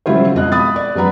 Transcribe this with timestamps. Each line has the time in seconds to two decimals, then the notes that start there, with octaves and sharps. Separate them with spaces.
0.06 C#3 F#3 G3 E4 F4 C5
0.34 E1 F2 D#5 F5 F#6
0.52 B5 D#6 A6
0.76 D5
0.95 F#2 F#3 B3 A#5 B5